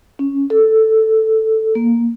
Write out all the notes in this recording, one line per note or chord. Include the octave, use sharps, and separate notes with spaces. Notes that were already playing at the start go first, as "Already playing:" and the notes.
C#4
A4
A#3